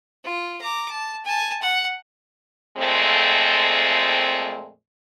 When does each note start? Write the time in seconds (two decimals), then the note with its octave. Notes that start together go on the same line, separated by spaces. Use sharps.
0.24 F4
0.62 A#5 D6
0.91 A5
1.25 G#5 A5
1.62 F#5
2.77 F2 A#2 G#3 A3 C4